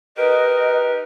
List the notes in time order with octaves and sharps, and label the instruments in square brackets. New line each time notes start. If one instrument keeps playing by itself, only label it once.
[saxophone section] D#4 G4 A#4 [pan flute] B4 [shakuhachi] D#5